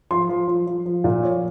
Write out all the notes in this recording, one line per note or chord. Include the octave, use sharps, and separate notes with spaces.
F3 C6
F3
F3
F3
F3
A#2
F3 C#5